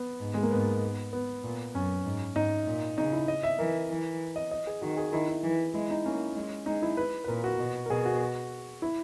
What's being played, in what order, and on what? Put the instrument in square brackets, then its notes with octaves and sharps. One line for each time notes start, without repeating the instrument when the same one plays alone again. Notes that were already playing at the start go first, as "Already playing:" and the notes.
Already playing: [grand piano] B3
[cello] G#2
[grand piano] G#3
A#3
[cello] G#2 [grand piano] B3
[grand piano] B3
[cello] A#2
[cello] F#2 [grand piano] C#4
[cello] G#2
[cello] G#2 [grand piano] D#4
[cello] A#2
[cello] C#3 [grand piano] D#4
[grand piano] E4
D#5
E5
[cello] E3 [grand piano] A#4
[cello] E3
[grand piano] D#5
D#5
G#4
[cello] D#3 [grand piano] F#4
[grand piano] G#4
[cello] D#3 [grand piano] E4
[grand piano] E4
[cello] E3
[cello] G#3 [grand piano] E4
[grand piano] D#4
[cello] A#3 [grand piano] C#4
[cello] G#3
[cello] G#3 [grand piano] D#4
[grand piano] E4
B4
B4
[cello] A#2 [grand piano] A#4
[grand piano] F#4
[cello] B2
[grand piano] A#4
[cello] B2 [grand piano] G#4
[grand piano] F#4
E4